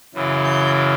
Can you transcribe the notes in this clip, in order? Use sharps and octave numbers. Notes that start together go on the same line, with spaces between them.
F#2 C#3 E3
G6